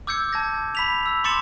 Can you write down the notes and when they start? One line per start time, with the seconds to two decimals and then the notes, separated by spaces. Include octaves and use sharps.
0.07 D6 E6 G6 G#6 C#7
0.33 A5 G#6 A#6
0.75 B5 B6 F7
1.06 E6
1.24 C6 D6 A6 C#7 E7